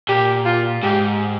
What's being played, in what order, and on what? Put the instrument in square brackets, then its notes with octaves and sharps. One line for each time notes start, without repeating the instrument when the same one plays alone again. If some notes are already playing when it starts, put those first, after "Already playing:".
[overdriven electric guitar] A#2 [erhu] G4
[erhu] F4
[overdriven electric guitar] G#2 [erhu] G4